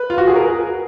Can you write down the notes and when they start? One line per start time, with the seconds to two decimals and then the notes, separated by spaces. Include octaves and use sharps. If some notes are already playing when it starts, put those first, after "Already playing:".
Already playing: B4
0.10 F4
0.18 F#4
0.28 G#4
0.36 A#4